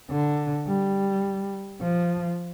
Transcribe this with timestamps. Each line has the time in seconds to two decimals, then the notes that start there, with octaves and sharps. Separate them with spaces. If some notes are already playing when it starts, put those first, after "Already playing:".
0.10 D3
0.67 G3
1.81 F3